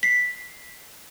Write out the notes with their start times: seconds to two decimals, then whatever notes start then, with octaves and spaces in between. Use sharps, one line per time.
0.03 B6 C7